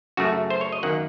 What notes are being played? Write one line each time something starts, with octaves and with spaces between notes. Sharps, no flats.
F#2 C#3 A3 F#4
C5
C#5
D#5
F#2 D#3 A#3 F#5